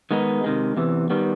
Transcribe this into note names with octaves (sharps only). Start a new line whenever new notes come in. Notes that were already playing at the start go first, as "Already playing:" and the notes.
D#3 G#3 B3 D#4
C3 D#3 G#3
E2 C3 E3
D#3 G3 B3